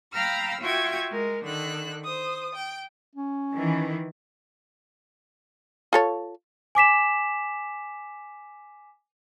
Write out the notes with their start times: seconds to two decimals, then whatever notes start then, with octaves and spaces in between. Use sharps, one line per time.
0.13 F5 G5 A#5 B5 E6 F6
0.61 F4 F#4 E5 G5 C#6 G#6
1.11 G#3 A#4
1.44 D3 D#3 E6 F#6
2.04 C5 D#6
2.55 G5
3.15 C#4
3.54 D#3 E3
5.93 F4 A4 C#5
6.75 G#5 D6 B6 E7